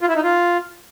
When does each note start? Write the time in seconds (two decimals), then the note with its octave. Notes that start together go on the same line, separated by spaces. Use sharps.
0.01 F4
0.09 E4
0.16 D#4
0.24 F4